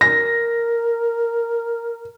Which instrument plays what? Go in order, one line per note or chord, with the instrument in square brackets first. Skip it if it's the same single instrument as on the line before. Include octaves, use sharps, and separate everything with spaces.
[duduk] A#4 [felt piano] A#6